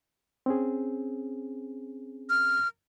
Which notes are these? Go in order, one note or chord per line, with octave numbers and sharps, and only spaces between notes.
C4 C#4 G#4
F6